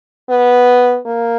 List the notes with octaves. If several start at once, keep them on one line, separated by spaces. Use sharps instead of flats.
B3
A#3